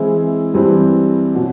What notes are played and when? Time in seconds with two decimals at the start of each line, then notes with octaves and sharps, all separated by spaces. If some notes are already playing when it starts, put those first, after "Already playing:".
Already playing: E3 G#3 C4 E4 G#4
0.54 G2 E3 G3 C4
1.35 B2 F#3